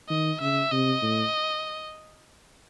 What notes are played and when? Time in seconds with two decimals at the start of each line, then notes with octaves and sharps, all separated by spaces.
0.09 D#3 D#5
0.41 C#3 E5
0.72 C3 D#5
1.02 A2